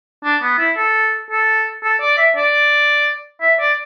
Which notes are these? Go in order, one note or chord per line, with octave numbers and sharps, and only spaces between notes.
D4
B3
E4
A4
A4
A4
D5
E5
D5
E5
D5